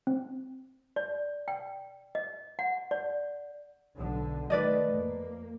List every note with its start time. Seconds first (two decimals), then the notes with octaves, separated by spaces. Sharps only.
0.07 C4
0.96 D5
1.48 G5
2.15 D#5
2.59 F#5
2.91 D5
3.97 B1 D3
4.50 D#3 A3 B4 D5 D#5
4.93 F2 A#3